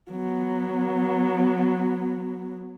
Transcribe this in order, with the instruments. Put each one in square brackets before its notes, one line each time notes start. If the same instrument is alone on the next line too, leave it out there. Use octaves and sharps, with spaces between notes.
[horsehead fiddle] F#3 B3